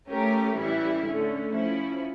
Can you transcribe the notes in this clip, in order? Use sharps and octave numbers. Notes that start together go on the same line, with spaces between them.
A3 C#4 G4 A#4
A2 E3 G3 C#4 E4
D3 A3 C#4
F3 C#4 E4